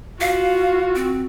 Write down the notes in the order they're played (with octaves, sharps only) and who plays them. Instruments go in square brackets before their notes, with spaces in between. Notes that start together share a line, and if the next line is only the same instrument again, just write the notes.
[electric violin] F4 F#4 [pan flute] F5
[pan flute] C4